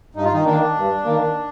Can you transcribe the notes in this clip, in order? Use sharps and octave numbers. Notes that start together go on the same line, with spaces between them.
G2 D#4
F4
D#3 D#4
D#3 A#3 D4
G2
D#3 A#3